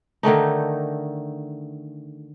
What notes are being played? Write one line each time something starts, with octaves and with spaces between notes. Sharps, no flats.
D3 D#3 A3 D#4